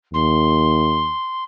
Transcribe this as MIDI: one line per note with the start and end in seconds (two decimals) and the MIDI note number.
0.13 1.13 39
0.13 1.44 84